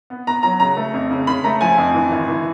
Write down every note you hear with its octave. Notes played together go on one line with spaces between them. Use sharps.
B3
B3 A#5
F#3 A#5
C#3 A#5
A3
F2
C#3
C#3 B5
A3 A#5
F3 G#5
F2
E3
G#1
E3